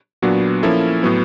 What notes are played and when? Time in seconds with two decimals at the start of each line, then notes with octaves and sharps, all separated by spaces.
0.22 A#2 F#3 B3 D4 F#4
0.63 F3 A#3 C#4 E4 A4
1.03 A2 F#3 B3